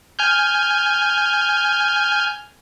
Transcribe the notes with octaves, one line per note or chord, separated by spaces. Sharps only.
G#5 F6 G6